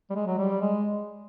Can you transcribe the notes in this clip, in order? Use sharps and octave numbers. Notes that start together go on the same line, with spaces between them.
G3
G#3
F#3
G3
G#3